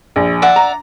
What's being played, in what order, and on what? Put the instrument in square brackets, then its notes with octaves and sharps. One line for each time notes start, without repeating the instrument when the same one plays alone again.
[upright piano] A#1
[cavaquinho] D5 E5 F#5
[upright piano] A#5